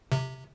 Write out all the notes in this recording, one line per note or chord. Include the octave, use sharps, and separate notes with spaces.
C3